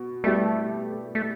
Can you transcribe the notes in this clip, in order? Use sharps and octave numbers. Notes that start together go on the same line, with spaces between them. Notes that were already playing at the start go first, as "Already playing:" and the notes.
Already playing: B2
G3 A3 B3 E4 G4
A3